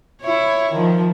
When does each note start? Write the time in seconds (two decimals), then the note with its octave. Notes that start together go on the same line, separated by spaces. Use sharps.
0.22 E4 C#5
0.73 D#3 F3